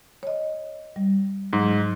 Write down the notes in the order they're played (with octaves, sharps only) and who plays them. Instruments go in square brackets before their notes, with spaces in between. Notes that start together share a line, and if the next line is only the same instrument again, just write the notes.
[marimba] C#5 D#5
G3
[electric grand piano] G#2 [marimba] F#3